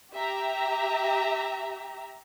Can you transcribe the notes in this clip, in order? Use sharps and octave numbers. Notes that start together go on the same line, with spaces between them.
G4 E5 A#5